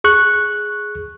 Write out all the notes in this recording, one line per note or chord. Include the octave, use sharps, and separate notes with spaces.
G#4 C#6 F#6